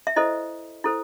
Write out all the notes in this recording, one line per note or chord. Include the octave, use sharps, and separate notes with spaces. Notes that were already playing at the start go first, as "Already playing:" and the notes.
E5
E4 A4 C5 D#5
E4 A4 C5